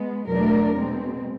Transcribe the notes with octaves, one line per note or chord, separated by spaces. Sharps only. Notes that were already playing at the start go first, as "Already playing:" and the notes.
Already playing: G#3 B3
E2 B2 F#3 A3 D4 A#4
B2 G#3 C4